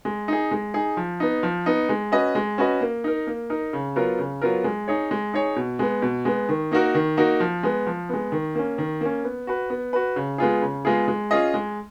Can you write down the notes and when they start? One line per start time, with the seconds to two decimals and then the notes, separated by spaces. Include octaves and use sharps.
0.05 G#3
0.28 D#4 G#4
0.51 G#3
0.74 D#4 G#4
0.97 F3
1.20 B3 D#4
1.43 F3
1.66 B3 D#4
1.89 G#3
2.12 C#4 F#4 B4 D#5
2.35 G#3
2.58 C#4 F#4 B4 D#5
2.81 A#3
3.04 D#4 A#4
3.27 A#3
3.50 D#4 A#4
3.73 C#3
3.96 F#3 B3 F4 A#4
4.19 C#3
4.42 F#3 B3 F4 A#4
4.64 G#3
4.88 D#4 G#4 C#5
5.11 G#3
5.33 D#4 G#4 C#5
5.56 B2
5.79 G#3 B3
6.02 B2
6.25 G#3 B3
6.49 D#3
6.71 A#3 D#4 F#4 A#4
6.94 D#3
7.17 A#3 D#4 F#4 A#4
7.40 F3
7.63 G#3 B3
7.87 F3
8.09 G#3 B3
8.32 D#3
8.55 A#3 C#4
8.78 D#3
9.01 A#3 C#4
9.24 B3
9.47 F#4 B4
9.70 B3
9.93 F#4 B4
10.16 C#3
10.38 G#3 B3 F4 G#4
10.62 C#3
10.85 G#3 B3 F4 G#4
11.08 G#3
11.31 C#4 F4 G#4 D#5
11.54 G#3